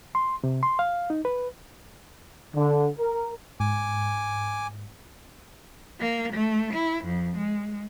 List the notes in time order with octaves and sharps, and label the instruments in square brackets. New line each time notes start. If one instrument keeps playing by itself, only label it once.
[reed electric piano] C6
C3
C6
F5
D#4
B4
[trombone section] D3
A#4
[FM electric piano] G#2 [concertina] G#5 D6
[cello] A#3
A3
E4
F2
G#3